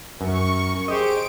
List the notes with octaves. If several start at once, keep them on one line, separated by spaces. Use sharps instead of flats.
F#2 A#4 C#6
G4 G#4 C5 D#5 D7